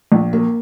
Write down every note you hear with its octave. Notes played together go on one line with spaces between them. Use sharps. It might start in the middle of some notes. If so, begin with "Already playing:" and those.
A#1
A#3